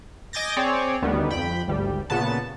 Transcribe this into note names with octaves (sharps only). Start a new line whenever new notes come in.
D#5 G#5 D6 G6 A6 A#6
C4 G#4 C#5 D5
D2 D#3 G3 B3
F2 G5 B5
G#1 D2 G3
A#2 C#3 B3 A5